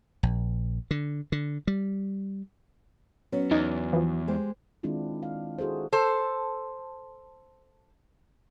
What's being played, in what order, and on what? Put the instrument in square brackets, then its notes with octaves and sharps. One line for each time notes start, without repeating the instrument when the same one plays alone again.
[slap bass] A#1
D3
D3
G3
[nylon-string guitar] F#3 B3 C#4
[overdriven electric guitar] E2 [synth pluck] D#4
[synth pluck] E3 F3
[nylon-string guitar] G#3 G4 C5
[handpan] D#3 G#3 C4 D4 E4 F4
F5
E4 F#4 G#4 A4 C5
[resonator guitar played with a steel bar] A4 C5